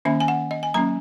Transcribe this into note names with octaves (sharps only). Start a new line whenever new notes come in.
D#3 A#3 C#4 E5
G#5
F#5
D#5
G#5
F#3 A#3 C#4 A#5